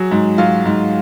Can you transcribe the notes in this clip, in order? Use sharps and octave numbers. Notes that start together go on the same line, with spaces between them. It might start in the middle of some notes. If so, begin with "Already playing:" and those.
Already playing: F#3 G#4
G#2
F#3 F4
G#2